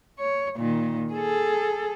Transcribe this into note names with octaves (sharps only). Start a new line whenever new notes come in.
C#5
A#2 D#3
G#4 A4